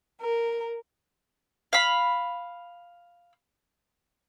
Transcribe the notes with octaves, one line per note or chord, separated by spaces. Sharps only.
A#4
F5 B5